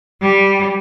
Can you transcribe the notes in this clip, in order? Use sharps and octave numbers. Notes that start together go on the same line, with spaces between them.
G3